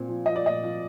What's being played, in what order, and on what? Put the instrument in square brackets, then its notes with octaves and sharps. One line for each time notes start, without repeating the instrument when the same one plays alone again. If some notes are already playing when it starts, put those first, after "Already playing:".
Already playing: [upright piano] A#2 C4
F3
F3 D#5
D5
A#2 D#5
F3